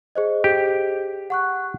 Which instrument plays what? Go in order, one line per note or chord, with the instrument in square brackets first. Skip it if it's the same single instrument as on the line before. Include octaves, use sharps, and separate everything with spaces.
[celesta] G#4 C5 D#5
[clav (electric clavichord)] G4
[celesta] F#5 C#6 F#6